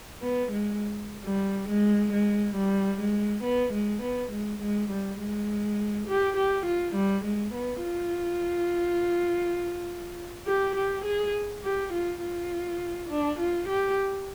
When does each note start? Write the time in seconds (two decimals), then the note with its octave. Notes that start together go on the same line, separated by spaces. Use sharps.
0.22 B3
0.52 G#3
1.24 G3
1.69 G#3
2.12 G#3
2.56 G3
3.00 G#3
3.44 B3
3.73 G#3
4.02 B3
4.32 G#3
4.62 G#3
4.91 G3
5.20 G#3
6.08 G4
6.37 G4
6.66 F4
6.95 G3
7.25 G#3
7.54 B3
7.83 F4
10.47 G4
10.76 G4
11.05 G#4
11.63 G4
11.93 F4
12.22 F4
13.09 D4
13.39 F4
13.69 G4